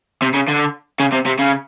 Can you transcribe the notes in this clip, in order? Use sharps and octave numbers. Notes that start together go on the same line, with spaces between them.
C3
C#3
D3
C#3
C3
C3
C#3